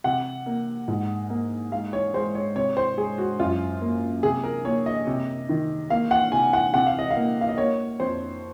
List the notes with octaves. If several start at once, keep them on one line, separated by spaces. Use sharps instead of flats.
C3 F#5
A#3
G#2
A#3
G#3 F5
C#5
G#3 C5
C#5
C3 C#5
C5
G#3 G#4
F#4
F#2 F4
A#3
C3 G#4
A#4
A#3 C#5
D#5
C3
D#3
A#3 F5
F#5
C3 G#5
F#5
C3 F#5
F5
D#5
F5
A#3
F5
D#5
A#3 C#5
F2 C5